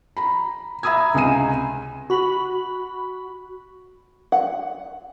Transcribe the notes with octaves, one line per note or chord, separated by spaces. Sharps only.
A#5 B5
E5 A#5 B5 D#6 E6 G#6
C#2 C3 G#5 A#5 D#7
F#4 B5
F#5